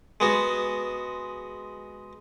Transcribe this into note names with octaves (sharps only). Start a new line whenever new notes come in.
G#3 B3 F#4